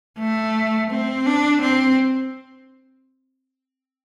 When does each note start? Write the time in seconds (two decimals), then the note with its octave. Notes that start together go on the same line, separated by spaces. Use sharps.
0.19 A3
0.91 C4
1.26 D4
1.62 C4